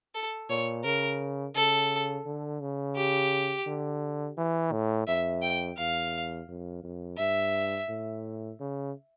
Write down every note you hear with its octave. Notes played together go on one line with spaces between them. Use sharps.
A4
A#2 C#5
C#3 A#4
C#3 A4
D3
C#3
G4
D3
E3
A2
F2 E5
G5
E2 F5
F2
F2
G2 E5
A2
C#3